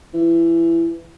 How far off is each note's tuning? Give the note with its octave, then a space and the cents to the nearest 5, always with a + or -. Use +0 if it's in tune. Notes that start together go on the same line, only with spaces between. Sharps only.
E3 +20